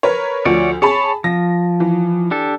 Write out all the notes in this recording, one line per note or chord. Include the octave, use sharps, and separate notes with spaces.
A#4 B4 C#5
D2 F3 F#4 C#5 D5
G#4 C#5 A5 B5
F3 A#6
E3
D4 G4 A4